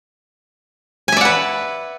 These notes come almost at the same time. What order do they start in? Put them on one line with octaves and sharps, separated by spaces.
G#5 E5 D5 F#5 B4